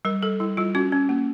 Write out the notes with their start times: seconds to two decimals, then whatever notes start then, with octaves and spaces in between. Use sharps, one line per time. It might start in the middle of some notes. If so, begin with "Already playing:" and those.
0.05 G3 A#4
0.22 G3 A4
0.40 G3 E4
0.57 G3 F4
0.75 C#4 F#4
0.92 C#4
1.09 A#3